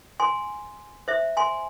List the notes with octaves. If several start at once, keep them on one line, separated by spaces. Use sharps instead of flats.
G#5 C6
C5 E5
G#5 C6